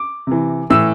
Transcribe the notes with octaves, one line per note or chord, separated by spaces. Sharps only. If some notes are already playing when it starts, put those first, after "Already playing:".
Already playing: D6
C3 E3
A2 E3 E6